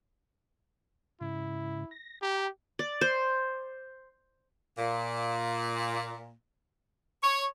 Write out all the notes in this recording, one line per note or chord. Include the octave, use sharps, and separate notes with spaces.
G#2 C#3 E4
A#6
G4 G5 A#5
D5
C5
A#2
C#5